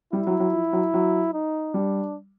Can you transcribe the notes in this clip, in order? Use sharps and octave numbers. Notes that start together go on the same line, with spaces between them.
G3 E4
F#3
F#3
F3
F#3
F#3
D#4
G3 D4